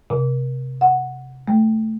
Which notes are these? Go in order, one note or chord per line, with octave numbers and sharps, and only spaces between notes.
C3
F#5
A3